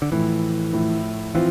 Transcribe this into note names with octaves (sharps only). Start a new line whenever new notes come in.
D3
A2 E3 F3 A3 E4
A2 F3 A3 E4
E3 F3 C4 F4